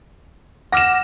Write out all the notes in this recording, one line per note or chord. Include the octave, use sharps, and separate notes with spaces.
F#5 D6 F6 A#6 E7